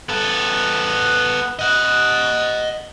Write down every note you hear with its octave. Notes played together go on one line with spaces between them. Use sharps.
B3 A4
D#5 F#5